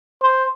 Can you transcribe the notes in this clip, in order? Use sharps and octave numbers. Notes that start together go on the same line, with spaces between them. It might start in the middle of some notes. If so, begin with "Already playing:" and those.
C5